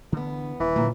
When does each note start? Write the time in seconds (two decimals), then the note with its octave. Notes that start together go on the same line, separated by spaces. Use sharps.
0.12 E2 D3 B3
0.60 D#1 E3
0.76 D#2 A#2 D3 F#3 G3